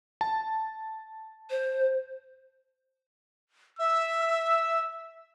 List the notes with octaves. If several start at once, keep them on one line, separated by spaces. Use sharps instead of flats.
A5
C5
E5 E6
E6